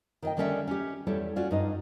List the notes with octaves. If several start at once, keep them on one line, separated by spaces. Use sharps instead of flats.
D#3 D#5 G5
D3 D#3 G3 C#4 D5 E5
C#4 G4
E2 G3 E4 A4 C#5
C#4 F4 F#4 D5
G2 D#4 D#5